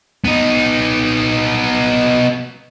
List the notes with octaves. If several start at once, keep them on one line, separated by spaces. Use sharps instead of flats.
B3 D#4